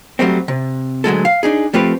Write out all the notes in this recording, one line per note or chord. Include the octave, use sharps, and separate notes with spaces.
F#3 G3 A3 C4
C3
D2 F#3 G#3 A4
F5
D4 D#4 G#4
F3 A3 C4 G4 B4